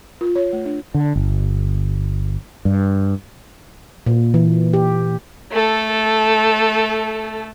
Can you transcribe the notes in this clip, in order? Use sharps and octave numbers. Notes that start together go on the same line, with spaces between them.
F4
C#5
A3
D4
D3
G1
G2
A#2
E3
G4
A3 A4